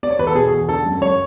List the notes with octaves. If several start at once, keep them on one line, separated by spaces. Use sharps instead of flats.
B3 D5
C#5
E2 B4
A4
B2 G#4
E2
D3 A4
F#2
F#2 C#5